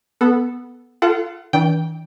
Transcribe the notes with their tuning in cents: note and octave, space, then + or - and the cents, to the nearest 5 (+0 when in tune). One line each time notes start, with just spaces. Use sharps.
B3 +0 A4 +0
F4 -20 A4 +0 F#5 +25
E3 -45 D4 -25 G5 +0